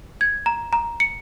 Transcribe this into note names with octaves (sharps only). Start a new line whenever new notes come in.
G#6
A#5
A#5
C#7